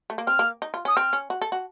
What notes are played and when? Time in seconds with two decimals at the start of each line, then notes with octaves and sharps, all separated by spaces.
0.10 A3
0.18 A#3
0.27 C4 F6
0.39 A#3
0.62 D#4
0.74 F4
0.85 C#4 D#6
0.96 C4 F6
1.13 C#4
1.30 F#4
1.42 A4
1.52 F#4